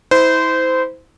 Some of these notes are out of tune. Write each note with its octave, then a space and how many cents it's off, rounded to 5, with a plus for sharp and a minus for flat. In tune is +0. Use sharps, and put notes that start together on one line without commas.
E4 -30 C5 -20